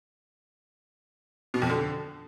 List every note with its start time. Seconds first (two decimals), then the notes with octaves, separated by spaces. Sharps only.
1.54 B2
1.62 F2
1.70 D3